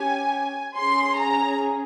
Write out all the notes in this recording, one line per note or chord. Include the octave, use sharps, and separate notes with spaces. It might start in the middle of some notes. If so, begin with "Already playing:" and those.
Already playing: C#4 G4 G#5
C#4 G#4 C6
A#5